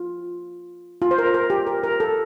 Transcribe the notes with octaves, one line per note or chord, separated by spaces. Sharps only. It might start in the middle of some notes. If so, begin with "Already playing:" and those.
Already playing: F4
F4
C5
A#4
A#4
G4
A#4
A#4
A4